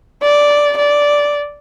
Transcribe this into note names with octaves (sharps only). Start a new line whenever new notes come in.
D5
D5